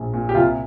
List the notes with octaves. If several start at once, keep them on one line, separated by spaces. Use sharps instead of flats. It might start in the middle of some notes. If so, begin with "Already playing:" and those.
Already playing: A#1
A#2
G4
C2 F4